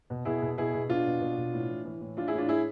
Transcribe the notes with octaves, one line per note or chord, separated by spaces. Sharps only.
B2
B2 E4 G#4
B2
B2 E4 G#4
B2
B2 D4 F4
B2
B2
B2
A2
E3
E3
A2
E3 D4 F4
E4 G#4
A2
D4 F4
A2 E4 G#4